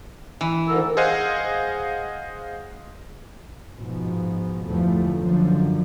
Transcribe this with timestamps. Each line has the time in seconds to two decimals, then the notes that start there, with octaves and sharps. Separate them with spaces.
0.41 E3
0.68 D2 D3 D#3 A4 A#4 E5
0.97 G#4 C5 D#5 F5 F#5 G#5
3.76 G#2 B2 F3
4.68 G1 E2 F3 A3
5.17 F#2 D3 F3